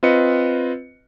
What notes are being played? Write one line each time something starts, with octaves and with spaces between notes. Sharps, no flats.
C4 F4 B4 D#5 C#7